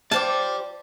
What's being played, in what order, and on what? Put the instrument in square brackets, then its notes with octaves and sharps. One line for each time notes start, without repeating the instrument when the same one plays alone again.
[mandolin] F4 C5 D6 [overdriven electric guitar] D5 G5 [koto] A5